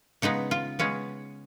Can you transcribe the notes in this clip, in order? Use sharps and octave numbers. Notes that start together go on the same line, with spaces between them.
C#3 G#3 B3 D#4
F4
C#3 G#3 B3 C#4